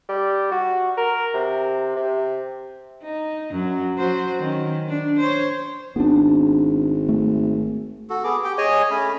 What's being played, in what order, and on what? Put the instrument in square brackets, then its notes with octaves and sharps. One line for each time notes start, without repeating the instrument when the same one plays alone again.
[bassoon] G3
F#4
A#4
C3
C3
[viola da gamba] D#4
F#2 F#3
F#3 F#4 C5
D#3 C#4
D4
C5 C#5
[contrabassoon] G#1 [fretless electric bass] B3 D4
[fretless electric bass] A3
[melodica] F#4 A4
B3 G#4 D6
G4 G5
G#4 C#5 D#5 G#5
A3 C#4 B5